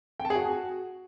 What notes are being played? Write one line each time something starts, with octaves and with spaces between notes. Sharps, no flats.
G5
A5
G#4
F#4